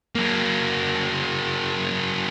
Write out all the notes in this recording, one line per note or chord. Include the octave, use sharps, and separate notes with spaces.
F#3 A#3